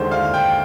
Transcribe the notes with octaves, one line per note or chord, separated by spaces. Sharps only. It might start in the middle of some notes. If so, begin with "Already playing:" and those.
Already playing: D#2 D3 G#3 C5
F5
G5